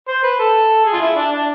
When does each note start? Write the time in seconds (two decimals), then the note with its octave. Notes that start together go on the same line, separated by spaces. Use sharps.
0.08 C5
0.24 B4
0.39 A4
0.85 G#4
0.93 F4
1.01 E4
1.16 D4
1.32 D4